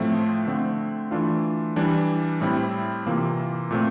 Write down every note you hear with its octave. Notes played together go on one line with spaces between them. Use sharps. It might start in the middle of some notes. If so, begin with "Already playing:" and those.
Already playing: A2 F3 A3 C4
D3 A3 C4
E3 A3 D4 F4
E3 G3 D4
A2 G3 C4 E4
C3 E3 A#3 F4
A#2 A3 C4